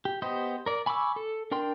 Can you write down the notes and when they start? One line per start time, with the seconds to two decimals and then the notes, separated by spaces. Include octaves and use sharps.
0.05 G4
0.22 B3 G4 C5 D#5
0.66 A#4 D5
0.86 G#5 B5 C#6 D6 E6
1.16 A4
1.51 D4 A#4 G5 C6